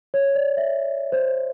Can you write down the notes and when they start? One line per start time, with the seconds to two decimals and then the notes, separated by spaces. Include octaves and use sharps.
0.14 C#5
0.35 D5
0.57 E5
1.12 C5